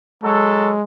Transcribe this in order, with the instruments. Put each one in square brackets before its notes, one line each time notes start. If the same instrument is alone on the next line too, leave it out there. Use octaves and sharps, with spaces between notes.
[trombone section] F#3 A4 [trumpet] G#3